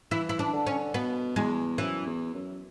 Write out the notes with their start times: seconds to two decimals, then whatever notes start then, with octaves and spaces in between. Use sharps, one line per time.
0.11 E3 E4
0.29 E4
0.39 D4
0.53 D3
0.67 C#4
0.94 B2 B3
1.36 E2 G#3
1.78 F#2 E3
2.06 E2
2.34 F#2